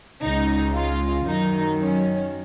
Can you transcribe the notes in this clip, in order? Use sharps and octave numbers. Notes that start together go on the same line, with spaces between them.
C#2 C#3 G#3 D#4
F4
F#2 D#3 F#3 D#4
C#4